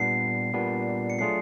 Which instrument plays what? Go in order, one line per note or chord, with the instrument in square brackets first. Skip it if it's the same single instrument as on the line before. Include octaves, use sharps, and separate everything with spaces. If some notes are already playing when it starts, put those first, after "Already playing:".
Already playing: [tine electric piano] A#2 G3 B3 D4 [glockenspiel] C7
[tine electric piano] A#2 G3 B3 D4
[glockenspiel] C#7
[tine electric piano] F#3 A3 D4 F4 G#4 [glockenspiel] C7